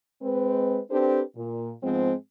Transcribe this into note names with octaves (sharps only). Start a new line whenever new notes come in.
G#3 C4 B4
C4 D4 G4 A4 B4 C5
A#2
G#2 F3 G#3 B3 C4